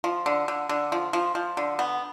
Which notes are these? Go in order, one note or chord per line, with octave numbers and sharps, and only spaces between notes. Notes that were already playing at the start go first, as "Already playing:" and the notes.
F3
D3
D3
D3
F3
F3
F3
D3
B3